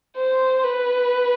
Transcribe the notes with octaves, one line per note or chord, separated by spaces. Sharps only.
C5
B4